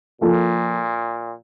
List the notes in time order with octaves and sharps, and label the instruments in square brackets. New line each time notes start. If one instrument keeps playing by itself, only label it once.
[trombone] A#2 [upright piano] F3 A#3 F4 A4